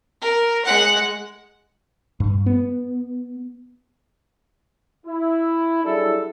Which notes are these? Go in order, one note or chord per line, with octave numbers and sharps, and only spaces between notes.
A#4
G#3 F#5
G2
B3
E4
F#3 G3 D4 E4 G#4 A4